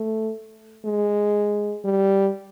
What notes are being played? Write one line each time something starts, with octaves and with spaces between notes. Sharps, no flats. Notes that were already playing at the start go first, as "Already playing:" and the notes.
Already playing: A3
G#3
G3